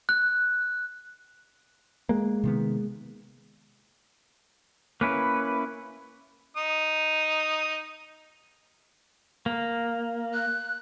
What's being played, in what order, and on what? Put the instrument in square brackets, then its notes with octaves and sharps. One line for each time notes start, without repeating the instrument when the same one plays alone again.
[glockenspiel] F#6
[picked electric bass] G#3 A#3
[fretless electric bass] C3 D#3 B3
[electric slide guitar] A#3 C#4 E4 [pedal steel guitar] B4
[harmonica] D#4 D#6
[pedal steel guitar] A#3
[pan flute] F#6